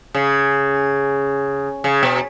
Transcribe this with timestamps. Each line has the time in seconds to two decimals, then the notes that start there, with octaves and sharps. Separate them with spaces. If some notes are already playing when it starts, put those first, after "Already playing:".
0.15 C#3
1.84 C#3
2.03 B2